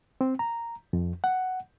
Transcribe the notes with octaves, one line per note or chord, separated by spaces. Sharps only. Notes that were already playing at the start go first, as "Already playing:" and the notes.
C4
A#5
F2
F#5